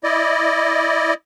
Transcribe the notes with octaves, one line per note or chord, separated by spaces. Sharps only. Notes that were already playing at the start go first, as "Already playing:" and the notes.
E4 D5 D#5